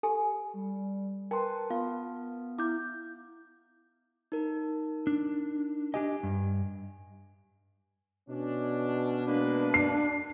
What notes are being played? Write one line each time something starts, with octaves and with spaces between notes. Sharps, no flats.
G4 A4 G#5
G3
A#4 B4 G5 A5 C6
B3 F4 F5
E4 D6 G6
D#4 A#4
D4
D4 G4 D#5 G#5
G2
B2 C#4 D4
G#3 A#3 D4 B4
C7